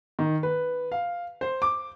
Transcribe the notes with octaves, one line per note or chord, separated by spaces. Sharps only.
D#3
B4
F5
C5
D6